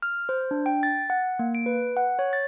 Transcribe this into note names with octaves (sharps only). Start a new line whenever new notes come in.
F6
C5
D4
G5
A6
F#5
A#3
D7
B4
F#5
C#5
A6